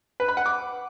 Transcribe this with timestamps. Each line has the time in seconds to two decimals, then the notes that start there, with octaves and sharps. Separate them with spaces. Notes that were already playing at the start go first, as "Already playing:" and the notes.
0.20 B4
0.28 B5
0.37 F#5
0.46 D6